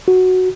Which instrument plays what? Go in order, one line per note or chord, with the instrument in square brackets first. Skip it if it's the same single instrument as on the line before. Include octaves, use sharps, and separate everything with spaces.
[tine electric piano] F#4